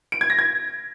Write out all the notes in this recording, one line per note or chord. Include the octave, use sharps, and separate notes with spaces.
D7
G#6
A#6
G#6